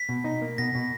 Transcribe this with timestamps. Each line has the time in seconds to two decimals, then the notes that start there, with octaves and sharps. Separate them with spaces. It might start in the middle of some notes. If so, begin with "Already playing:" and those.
Already playing: B6
0.09 B2
0.24 D#4
0.42 A#3
0.58 B2 A#6
0.75 B2